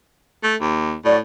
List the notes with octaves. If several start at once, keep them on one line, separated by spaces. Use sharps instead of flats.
A3
D#2
A2 F#4 D5